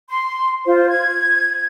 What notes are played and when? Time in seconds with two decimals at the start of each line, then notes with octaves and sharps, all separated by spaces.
0.09 C6
0.66 F4 C5
0.89 G#6